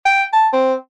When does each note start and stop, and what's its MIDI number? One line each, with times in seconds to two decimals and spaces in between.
0.06 0.23 79
0.33 0.48 81
0.53 0.74 60